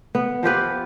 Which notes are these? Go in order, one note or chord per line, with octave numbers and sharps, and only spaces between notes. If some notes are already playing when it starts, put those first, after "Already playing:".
B3
F3 F4 G4 B4